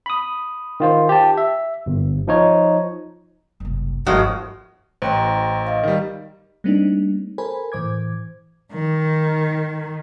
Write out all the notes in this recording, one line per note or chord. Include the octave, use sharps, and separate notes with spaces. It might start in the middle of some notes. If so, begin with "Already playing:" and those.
B5 D#6
D#3 F4 C5
G4 A5
E5
G1
F3 D#4 C#5
F#1 C2
G1 F3 G#3 A3 D#4 F#4 A#4 C#5
A1 C5 G5 A#5
D#5 F5
D#3 G3
G3 A3 A#3 C4 D4 D#4
A4 A#4 C5 G#5 B5
A2 E3 C5 D6 G#6
D#3